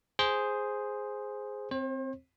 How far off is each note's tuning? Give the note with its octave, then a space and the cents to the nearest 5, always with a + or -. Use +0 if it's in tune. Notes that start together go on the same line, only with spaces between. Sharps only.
G#4 +0 C5 +0
C4 +0 C5 +40